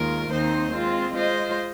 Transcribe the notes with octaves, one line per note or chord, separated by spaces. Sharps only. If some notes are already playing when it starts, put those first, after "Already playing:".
Already playing: D#2 D#3 G#3 F4 A#4
D#2 D#3 C4 D#4 C5
G#3 C4 F4
G#3 F4 C5 D#5